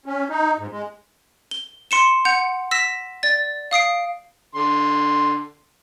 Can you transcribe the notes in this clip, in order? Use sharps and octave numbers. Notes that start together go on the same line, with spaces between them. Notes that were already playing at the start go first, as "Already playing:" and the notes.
C#4
D#4
G#2
G#3
G7
C6 C#7 E7
F#5 G6 C#7 F7
E6 A#6 B6 E7
D5 A6
F5 D#6 C7 D7
D3 C6